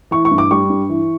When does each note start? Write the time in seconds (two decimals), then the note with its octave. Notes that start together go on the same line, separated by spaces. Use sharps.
0.11 E3 C#6
0.25 C#6
0.31 G2
0.38 D6
0.51 G3 C#6
0.70 G2
0.89 E3